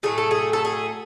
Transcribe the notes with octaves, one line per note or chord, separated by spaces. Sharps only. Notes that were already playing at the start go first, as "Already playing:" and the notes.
A2 F#3 A3 G#4
A4
G#4
A4
G#4